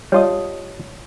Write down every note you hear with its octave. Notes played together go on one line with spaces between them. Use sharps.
G3 F4 C#5 D#5 A5 D#6